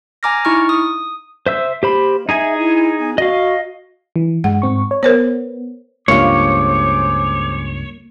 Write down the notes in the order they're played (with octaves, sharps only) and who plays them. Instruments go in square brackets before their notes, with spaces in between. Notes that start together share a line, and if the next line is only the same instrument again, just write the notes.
[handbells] G#5 A#5 D6 F6 A#6
D#4 E4 C#6 F6
D#6
[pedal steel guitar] C5 E5 E6
[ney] A#3 [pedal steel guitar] G4 C5 B5
[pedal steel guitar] D#4 G#4 G#5 [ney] E5
[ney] E4
B3
[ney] F#4 [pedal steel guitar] D#5 F5
[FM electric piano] E3
[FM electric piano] G2 G#3 [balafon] F#5
[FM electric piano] G#2 C4 C#6
C#5
[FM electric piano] B3 [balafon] A#4 C5 C#5
[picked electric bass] C#2 G2 [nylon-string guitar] A#3 F4 [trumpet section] G#4 C5 D6 [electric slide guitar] C#5